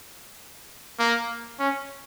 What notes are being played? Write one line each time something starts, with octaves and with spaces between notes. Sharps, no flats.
A#3
C#4